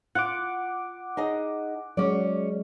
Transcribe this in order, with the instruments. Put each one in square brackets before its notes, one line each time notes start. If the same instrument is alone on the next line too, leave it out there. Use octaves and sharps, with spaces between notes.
[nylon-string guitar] F4 [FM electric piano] F#5 D6
[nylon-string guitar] D#4 G#4 D#5
[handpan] F#3 G#3 [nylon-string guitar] C#4 D5